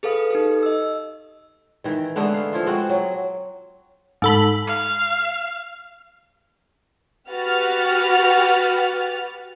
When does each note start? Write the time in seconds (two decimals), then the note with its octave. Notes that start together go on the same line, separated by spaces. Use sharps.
0.03 G#4 A4 B4 F5 D#6
0.31 D#4 G4 A4
0.63 D#5 E6
1.84 D#3 E3
2.16 D3 G#3 A3 B3
2.34 F5
2.53 F3 E4 F4
2.66 G#3 C4 F#4 F#5
2.89 F#3
4.22 G#2 A4 B5
4.67 F5
7.30 F#4 G4 B4 F6 A6